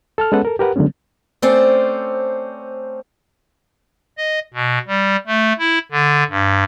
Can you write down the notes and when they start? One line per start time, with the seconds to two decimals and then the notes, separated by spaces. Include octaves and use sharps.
0.18 A4 A5 F6
0.32 G#3 B3 C#4 A4 B4 F#5
0.45 A4 A#4
0.59 G4 A#4 B4 F#5
0.76 D3 F#3 G#3 B3 C#4
1.42 A3 C4 C#4 C5 D5
4.18 D#5
4.54 B2
4.87 G3
5.27 A3
5.59 E4
5.91 D3
6.30 G2